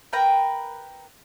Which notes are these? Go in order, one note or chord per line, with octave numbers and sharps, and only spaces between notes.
A#4 B4 G5 A#5